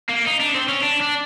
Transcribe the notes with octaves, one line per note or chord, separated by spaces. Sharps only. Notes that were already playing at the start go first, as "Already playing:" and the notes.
A#3
D#4
D4
C4
C#4
D4
D4